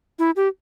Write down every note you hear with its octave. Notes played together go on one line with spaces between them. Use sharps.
E4
G4